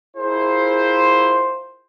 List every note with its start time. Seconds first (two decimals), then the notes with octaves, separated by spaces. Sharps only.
0.17 E4 F4 G#4 A#4 C5